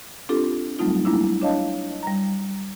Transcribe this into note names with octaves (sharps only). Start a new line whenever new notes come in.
C4 D4 F4 G4 A4
F#3 G3 A3 C4 D#4 F4
G3 A#3 D4 E4
D4 C#5 D#5 F5 A5
G3 A#5